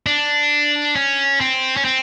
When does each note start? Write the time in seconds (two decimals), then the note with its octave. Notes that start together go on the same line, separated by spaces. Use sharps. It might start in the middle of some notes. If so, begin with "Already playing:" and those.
0.06 D4
0.96 C#4
1.41 C4
1.77 C#4
1.85 C4